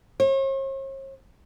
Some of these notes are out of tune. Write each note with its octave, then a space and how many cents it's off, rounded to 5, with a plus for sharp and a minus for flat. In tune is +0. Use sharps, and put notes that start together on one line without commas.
C#5 -45